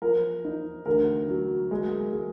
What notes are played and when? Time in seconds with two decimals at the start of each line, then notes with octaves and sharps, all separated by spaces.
0.02 F3 A#4
0.45 D#4
0.86 D2 A#4
1.28 F#3
1.71 G#3
2.13 G#3